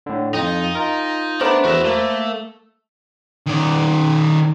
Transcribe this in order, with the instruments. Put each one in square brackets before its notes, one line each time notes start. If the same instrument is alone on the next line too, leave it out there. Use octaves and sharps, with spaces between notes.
[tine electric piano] A2 D3
[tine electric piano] F2 F4 [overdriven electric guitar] D#4 [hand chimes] G5
[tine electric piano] F4 A#4
[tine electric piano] A3 B3 A#4 [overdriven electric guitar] D4 [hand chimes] C5 B5
[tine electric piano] E2 [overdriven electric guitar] F#4 E5
[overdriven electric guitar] A3 [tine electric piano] A#3
[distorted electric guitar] D#3 D5